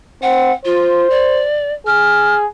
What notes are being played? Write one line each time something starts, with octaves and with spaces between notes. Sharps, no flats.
C4 F#5
F4 C5
D5
G#4 F6